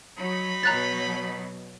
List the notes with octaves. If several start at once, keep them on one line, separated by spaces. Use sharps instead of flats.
F#3 D#4 B5
B2 F#3 A#5 F#6 A6